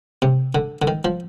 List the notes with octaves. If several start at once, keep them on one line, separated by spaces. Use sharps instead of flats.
C3
D3
D3
D#3
F3